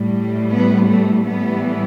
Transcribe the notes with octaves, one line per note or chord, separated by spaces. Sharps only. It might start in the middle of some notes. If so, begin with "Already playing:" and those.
Already playing: A2 G3
B3
A3
A2 E3 G3 B3